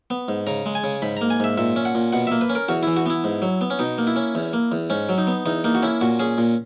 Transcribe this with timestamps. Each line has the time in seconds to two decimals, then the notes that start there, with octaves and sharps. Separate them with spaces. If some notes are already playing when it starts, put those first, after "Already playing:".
0.10 B3
0.28 G#2
0.47 C#3 A#5
0.66 G#3
0.75 G#5
0.84 C#3
1.02 G#2 B5
1.17 A#3 A#5
1.30 G#5
1.40 G#2 E5
1.57 A#2 E5
1.76 C#4
1.85 F#5
1.95 A#2
2.13 B2 F#5
2.27 A#3 E5
2.41 B4
2.49 C#4
2.55 A#4
2.69 E2 F#4
2.83 E3 E4
2.97 F#4
3.06 B3 E4
3.24 G#2
3.42 F#3
3.61 B3
3.70 C#4
3.79 B2 D#4
3.98 A#3
4.07 E4
4.16 C#4
4.35 E2
4.53 A#3
4.72 E2
4.90 G#2 C#4
5.09 F#3
5.18 D#4
5.27 B3
5.46 E2 D#4
5.64 A#3 D#4
5.75 F#4
5.82 C#4 E4
6.01 A#2 F#4
6.19 C#4 G#4
6.38 A#2